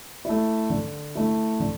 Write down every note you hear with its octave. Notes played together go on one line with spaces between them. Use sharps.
A3 E4
D3
A3 E4
D3